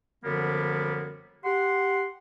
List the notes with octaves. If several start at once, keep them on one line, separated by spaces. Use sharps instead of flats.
F#2 D3 F3 G3 A#3 B3
G4 F#5 C6